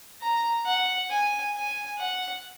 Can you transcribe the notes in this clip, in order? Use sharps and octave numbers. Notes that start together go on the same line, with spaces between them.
A#5
F#5
G#5
G#5
F#5